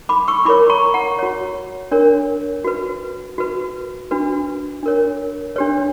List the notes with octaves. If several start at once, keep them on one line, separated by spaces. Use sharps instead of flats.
B5 D6
C#6 E6
E4 A#4 C#5 B5 D6
A#5 C#6
F#5 A#5
F#4 C#5
D4 A#4 C#5
F#4 B4
F#4 B4
D4 F#4 B4
D4 A#4 C#5
D4 G4 B4 C#5